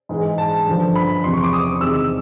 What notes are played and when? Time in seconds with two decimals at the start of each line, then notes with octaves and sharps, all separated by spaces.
0.09 G#2 E3 G#3
0.38 A5
0.66 G2 D3 F3
0.96 B5
1.24 E2 C3 F3 C6
1.33 C#6
1.43 D6
1.53 D#6
1.81 E2 C3 D#3 G#3 E6